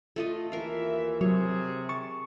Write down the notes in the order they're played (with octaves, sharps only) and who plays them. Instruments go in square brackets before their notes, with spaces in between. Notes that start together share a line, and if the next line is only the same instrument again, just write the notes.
[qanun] A3 F4 D#5
[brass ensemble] D#2 E3 E5 [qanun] A#4 F5
[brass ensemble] C3 G#4 [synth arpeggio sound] F#3 [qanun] C#5
[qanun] A5 [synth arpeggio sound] C#6